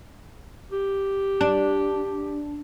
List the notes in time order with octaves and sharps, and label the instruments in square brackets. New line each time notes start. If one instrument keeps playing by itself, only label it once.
[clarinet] G4
[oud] D4